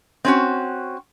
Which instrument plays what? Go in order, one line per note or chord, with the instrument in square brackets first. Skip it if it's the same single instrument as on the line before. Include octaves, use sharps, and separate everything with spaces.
[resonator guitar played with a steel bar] C4 C#4 F#4